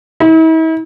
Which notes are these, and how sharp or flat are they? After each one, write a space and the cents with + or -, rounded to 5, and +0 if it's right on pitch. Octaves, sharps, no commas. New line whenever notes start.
E4 -45